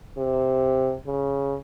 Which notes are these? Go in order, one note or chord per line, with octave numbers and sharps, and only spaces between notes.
C3
C#3